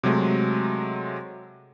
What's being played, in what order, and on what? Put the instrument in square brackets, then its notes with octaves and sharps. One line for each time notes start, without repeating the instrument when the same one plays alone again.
[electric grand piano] C3 F#3 G#3 A3